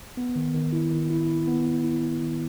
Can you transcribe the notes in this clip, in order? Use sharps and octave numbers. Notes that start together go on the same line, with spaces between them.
B3
D#3
D#3
E4
D#3
E4
E4
B3
B3
E4
E4
D#3